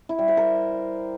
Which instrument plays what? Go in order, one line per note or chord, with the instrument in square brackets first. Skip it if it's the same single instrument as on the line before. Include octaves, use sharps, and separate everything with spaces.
[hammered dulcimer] E4
G3
C5
A#4